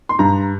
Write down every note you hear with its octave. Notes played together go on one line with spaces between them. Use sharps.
C6
G2 A#5